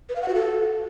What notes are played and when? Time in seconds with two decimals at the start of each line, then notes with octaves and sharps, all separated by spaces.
0.09 B4
0.16 F5
0.22 F#5
0.28 F#4
0.35 A4